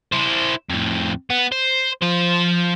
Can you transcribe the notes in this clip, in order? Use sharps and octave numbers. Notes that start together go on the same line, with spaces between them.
E4 C5
F2 A2
B3
C5
F3 C5